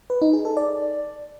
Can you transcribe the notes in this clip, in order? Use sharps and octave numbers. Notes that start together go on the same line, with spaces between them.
B4
D#4
G#4
A4
D5